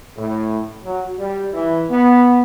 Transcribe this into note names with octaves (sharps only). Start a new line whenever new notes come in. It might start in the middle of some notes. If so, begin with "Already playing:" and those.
A2
F#3
G3
E3
B3